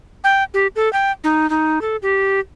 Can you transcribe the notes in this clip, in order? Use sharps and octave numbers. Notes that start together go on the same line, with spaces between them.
G5
G4
A4
G5
D#4
D#4
A4
G4